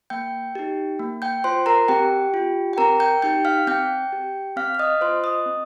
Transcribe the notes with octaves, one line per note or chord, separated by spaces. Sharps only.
A#3 G5 G6
D#4 G4
A#3
G5 G6
F4 C5 C6
A#4 A#5
C4 G4 G5
F4
G5
C4 A#4 A#5
G5 G6
D#4 G4 G5 G6
F5 F6
C4 G5 G6
G4
C4 F5 F6
F6
D#5 D#6
F4 C5 C6
D#5 D#6
C4